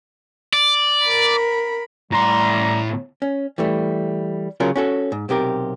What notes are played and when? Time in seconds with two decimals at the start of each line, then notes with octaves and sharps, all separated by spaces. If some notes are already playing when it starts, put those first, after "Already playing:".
0.53 D5
1.03 A#4 B5
2.12 A2 G3 A#5 C6
3.22 C#4
3.58 E3 G3 A3
4.60 C#3 F#3 F4 A#4
4.76 C#4 F#4 A4
5.12 G#2
5.29 B1 C3 G4 A#4